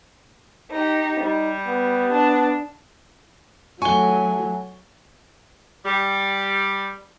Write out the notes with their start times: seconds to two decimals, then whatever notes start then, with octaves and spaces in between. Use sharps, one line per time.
0.71 D#4 G4
1.20 G3 D#4
1.67 B3
2.12 D4
3.82 F#3 A3 G#5 C#6 G7
5.86 G3